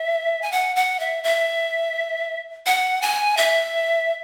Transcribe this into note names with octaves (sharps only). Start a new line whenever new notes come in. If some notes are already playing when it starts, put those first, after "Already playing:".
Already playing: E5
G#5
F#5
F#5
E5
E5
F#5
G#5
E5